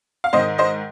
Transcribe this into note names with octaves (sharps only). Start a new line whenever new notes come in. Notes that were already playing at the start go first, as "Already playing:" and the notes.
F5
G#2 D#3 C5 D#5
C5 D#5